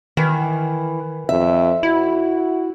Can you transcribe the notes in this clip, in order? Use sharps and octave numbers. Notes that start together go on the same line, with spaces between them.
D#3 E3
F2 E5
E4 F#4